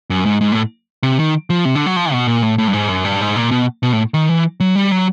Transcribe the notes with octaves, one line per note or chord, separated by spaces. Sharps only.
F#2
G#2
G#2
A2
C3
D#3
F3
C3
D3
F#3
F3
B2
A#2
A2
A2
G2
G#2
F#2
G2
G#2
A#2
B2
B2
A2
D#3
E3
F#3
G3
F#3